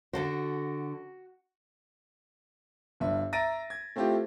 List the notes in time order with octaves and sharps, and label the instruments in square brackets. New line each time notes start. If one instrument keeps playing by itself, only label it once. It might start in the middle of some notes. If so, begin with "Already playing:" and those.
[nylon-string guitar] D3 A4 C5 [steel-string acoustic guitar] F#4
[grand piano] G1 G2 E5
E5 A#5 A6 A#6 D7 D#7
G#6
A3 C4 E4 F4 G4